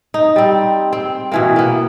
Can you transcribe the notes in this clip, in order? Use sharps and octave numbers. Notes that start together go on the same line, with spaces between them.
D#4
G3 C4
C4
B2 E3 A#3
A#3 B3